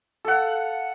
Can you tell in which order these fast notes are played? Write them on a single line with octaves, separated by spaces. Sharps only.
A4 F#5 F5